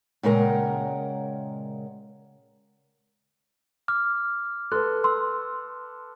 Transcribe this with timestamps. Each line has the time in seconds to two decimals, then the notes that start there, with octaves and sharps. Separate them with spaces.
0.23 A#2 C#3 G#3 A#4 F#5 G5
3.88 D6 F6
4.72 A4 B4 C6 F#6
5.04 C6 E6